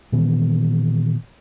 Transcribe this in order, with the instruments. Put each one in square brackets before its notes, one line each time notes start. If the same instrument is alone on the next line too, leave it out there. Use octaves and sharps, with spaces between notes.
[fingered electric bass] A#2 D#3 E3 B3